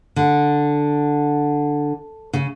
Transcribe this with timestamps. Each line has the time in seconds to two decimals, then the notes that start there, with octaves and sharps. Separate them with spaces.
0.16 D3
2.33 C#3